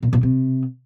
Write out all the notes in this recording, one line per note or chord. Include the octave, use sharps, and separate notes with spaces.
A#2
A#2
C3